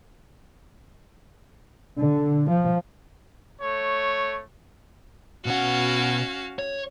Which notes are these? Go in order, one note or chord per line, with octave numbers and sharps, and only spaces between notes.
D3
F3
A3 C#5
B2 C#4 F#4 F5 F#5
C#5